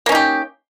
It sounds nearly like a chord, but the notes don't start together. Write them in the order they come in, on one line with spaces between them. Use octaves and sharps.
A#3 C#4 D#4 G4